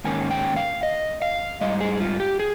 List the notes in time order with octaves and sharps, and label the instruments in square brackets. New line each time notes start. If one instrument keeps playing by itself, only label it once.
[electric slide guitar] G#2 D#3 A#3 C#4 G#5
G5
F5
D#5
F5
G#2 G3 D#5
G#4
F4
G4
G#4